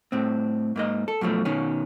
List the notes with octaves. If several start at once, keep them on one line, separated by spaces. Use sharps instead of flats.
A2 C4
G#2 A#3 D#5
A4
F#2 B2 F3 A3
B2 D#3 C#4